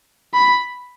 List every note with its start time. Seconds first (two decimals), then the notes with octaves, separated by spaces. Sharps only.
0.34 B5